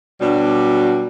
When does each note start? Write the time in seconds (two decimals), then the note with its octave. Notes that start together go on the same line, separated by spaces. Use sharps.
0.21 B2 F#3 G3 D4 F#4